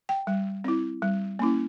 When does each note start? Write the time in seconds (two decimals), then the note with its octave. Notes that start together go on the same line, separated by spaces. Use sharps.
0.09 G5
0.27 G3
0.64 C4 E4
1.02 G3
1.39 A#3 C#4 E4